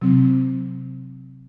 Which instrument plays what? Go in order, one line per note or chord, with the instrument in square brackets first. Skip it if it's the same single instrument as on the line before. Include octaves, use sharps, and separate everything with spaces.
[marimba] C3 F#3 C4